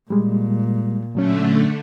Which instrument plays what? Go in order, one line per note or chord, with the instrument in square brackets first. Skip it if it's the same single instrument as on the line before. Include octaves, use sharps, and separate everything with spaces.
[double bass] A#2 [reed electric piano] G3 G#3
[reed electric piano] A#2 F#3 C#4 [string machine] D3 A3